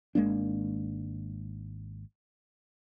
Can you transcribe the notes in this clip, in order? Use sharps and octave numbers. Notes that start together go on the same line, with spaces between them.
G#1 G#3 A#3 D4